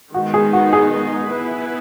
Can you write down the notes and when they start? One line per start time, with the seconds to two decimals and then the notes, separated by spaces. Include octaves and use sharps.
0.14 D#3 G#3 B3 D#4 F#4
0.34 G#4
0.53 F#4
0.73 G#4
1.31 B3 E4 B4